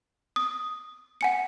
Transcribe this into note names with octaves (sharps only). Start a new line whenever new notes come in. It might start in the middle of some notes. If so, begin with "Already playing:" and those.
D#6
F#5 G#5 C#7